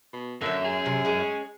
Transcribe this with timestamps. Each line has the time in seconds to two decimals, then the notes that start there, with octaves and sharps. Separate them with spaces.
0.13 B2
0.41 F#2 D3 A#3 E5
0.65 G#4
0.86 C3
1.05 G#3 C#4